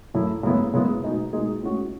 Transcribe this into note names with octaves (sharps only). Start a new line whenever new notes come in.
F#2 E3 A3 E4
F#2 C#3 G#3 B3 E4
F#2 C#3 G#3 B3 E4
B2 G#3 D#4 G#4
B2 G#3 D#4 G#4
A2 G#3 C#4 F#4